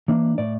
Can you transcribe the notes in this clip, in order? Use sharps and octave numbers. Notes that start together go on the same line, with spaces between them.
E3 A#3 D4
A2 D5